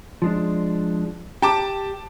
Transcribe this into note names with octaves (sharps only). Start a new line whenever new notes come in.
F3 G#3 D4
G4 G5 A5 D6